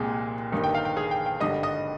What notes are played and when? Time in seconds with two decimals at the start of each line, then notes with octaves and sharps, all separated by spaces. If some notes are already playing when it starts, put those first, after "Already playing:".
Already playing: C2 A#2 G#3 C4 G#4 G5 G#5
0.52 G1 G2 D#3 A#3 D#4
0.64 G5
0.75 F5
0.85 G5
0.97 G#4 G#5
1.11 G5
1.26 G5
1.40 G#1 G2 D3 G3 D#5 D#6
1.63 D#5 D#6